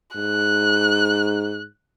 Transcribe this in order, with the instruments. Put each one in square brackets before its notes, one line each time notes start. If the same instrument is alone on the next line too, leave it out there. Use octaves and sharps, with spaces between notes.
[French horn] G#2 [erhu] F#6